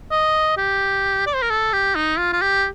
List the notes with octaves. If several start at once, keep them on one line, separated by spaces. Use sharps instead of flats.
D#5
G4
D5
C5
A#4
A4
G4
D#4
F4
F4
G4